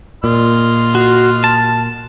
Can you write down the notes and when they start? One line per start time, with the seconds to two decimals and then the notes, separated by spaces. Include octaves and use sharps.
0.24 A#2 D#5 C6 F6
0.95 F#4
1.44 A5